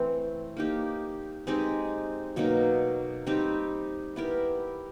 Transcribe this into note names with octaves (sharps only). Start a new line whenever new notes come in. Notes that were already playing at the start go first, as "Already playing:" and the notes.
Already playing: E3 A3 C4
A#3 D#4 G4
G#3 C4 D#4 G4
B2 F#3 A#3 D#4
G3 C4 D#4 G4
B3 E4 G4 A#4